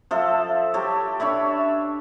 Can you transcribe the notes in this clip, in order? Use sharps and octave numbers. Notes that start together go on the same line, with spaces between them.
F3 A4 E5
G4 A4 C#5
D4 C#5 E5 B5